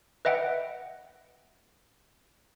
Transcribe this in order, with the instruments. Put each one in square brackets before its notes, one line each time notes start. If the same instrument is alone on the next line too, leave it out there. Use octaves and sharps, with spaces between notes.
[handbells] B4 D#5 E5 F#5 G5